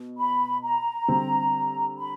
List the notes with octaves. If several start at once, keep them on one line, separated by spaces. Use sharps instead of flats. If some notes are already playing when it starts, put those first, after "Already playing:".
Already playing: B2
B5
A#5
D3 G3 C4
B5